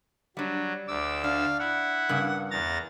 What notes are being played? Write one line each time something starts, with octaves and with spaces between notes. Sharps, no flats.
F#3 G3 D4
D2 D6 E6
D4 F5
E4 F#5
G2 C#3 A#3
E2 A#5 A6